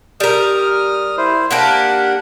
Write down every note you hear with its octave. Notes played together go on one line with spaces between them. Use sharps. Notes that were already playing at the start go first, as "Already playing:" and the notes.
G3 A#4 D#6 F6
E4 C5
A#3 D4 G4 F#5